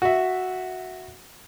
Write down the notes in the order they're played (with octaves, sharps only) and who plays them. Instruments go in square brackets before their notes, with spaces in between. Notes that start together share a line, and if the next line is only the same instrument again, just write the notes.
[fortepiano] F#4 E5